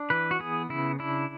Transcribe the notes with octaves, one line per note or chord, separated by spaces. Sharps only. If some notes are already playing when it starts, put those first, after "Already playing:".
Already playing: D4
E3 B4
F#4
B3 G#4
C#3 E4
D4 E4